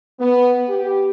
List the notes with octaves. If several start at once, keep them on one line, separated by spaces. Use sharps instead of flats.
B3
G4